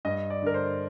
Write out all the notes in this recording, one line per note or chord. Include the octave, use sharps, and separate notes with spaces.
G2 D#5
D5
D3 A#4
C5